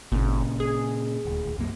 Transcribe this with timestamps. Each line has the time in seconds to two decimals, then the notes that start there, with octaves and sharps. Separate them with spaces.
0.12 G#1 A#2 C#3
0.60 G#4
1.25 D#1 D2
1.57 C2 F#2 A#3